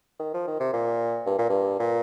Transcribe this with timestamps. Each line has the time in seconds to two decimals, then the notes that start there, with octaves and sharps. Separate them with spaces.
0.20 D#3
0.34 F3
0.47 D#3
0.60 C3
0.73 A#2
1.26 G2
1.38 A#2
1.49 G2
1.79 A#2